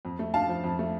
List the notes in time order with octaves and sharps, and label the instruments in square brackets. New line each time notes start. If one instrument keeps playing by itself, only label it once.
[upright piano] F2
A3
D4 F5 A5
F3
F2
A3